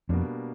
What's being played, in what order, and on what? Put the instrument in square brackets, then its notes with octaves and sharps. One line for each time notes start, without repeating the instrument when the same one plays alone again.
[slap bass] F2 [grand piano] B2 G3 A#3 D4